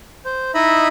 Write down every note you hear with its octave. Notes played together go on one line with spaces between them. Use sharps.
C5
D#4 E4 D#5 E5 B5